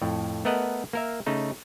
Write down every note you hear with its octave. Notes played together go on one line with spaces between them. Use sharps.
F2 A2
A3 B3 A#4 D#5 F#5
A#3 A#4 E5
C#3 A3 D#4